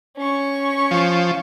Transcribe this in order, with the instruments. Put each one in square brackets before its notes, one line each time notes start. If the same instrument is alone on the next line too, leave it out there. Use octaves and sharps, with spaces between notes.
[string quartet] C#4 C#6
[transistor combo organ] F3